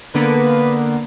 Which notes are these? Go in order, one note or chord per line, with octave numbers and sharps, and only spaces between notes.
D3 A#3 B3 B4